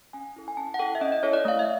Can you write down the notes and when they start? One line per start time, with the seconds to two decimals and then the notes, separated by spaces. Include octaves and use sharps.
0.13 C#4 G#5
0.36 E4 A4
0.48 G#5
0.57 C#4 A5
0.74 F#5
0.79 E4 A4 G5
0.95 E5
1.01 C#4 D#5
1.12 D#5
1.23 E4 A4 C#5
1.33 D5
1.45 A3 F5
1.59 E5